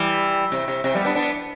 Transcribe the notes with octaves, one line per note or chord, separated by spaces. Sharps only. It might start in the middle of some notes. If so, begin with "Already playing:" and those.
Already playing: E3 G3
C3
C3
C3
G3 B3
B3 D4
B3 D4